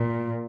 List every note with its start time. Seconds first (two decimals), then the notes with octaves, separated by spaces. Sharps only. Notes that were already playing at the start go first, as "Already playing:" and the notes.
Already playing: A#2